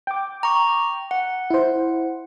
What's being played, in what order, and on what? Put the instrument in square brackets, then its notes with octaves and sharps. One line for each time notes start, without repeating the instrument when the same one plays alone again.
[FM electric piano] G5 D6
[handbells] A#5 C#6
F#5
[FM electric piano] E4 C5